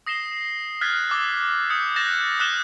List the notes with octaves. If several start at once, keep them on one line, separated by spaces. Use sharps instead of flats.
D#6 A#6 C7 E7 G7
F6 F#6 G#6 A6 B6
D6 E6
D#6 G6 C#7
F#6 G6 A6 A#6 E7 F7
D#6 F6 F#6 B6 E7 G7